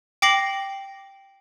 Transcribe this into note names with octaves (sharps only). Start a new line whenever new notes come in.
G5 D6 A#6 C7 F#7